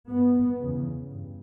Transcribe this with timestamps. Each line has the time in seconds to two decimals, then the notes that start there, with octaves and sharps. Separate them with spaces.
0.09 G2 B3
0.60 E2 C#3
1.12 G2